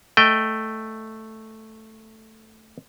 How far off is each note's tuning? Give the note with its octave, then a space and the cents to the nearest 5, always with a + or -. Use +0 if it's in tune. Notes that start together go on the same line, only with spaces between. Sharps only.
A3 +0 D#5 +0 G5 +0